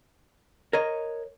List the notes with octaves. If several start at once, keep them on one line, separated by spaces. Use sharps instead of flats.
A#4 C#5 D#5